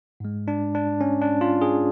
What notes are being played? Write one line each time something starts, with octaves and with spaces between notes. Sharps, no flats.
G#2 G#3
D4
D4
C#4
D4
F4
G#4